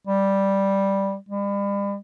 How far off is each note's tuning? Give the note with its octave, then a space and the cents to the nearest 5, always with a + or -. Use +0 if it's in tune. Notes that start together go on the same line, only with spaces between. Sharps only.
G3 +0
G3 +40